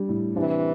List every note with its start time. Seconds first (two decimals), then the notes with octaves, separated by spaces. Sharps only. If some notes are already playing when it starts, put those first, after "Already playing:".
Already playing: G3 D4
0.09 A2
0.35 C3 E3 D4